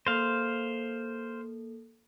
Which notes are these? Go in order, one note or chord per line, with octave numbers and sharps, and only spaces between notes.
A#3 A4 C5 F5